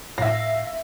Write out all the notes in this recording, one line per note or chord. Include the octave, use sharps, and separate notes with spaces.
A2 E5 F5 A#6